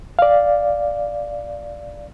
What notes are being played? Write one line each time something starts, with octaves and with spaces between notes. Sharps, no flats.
D5 F5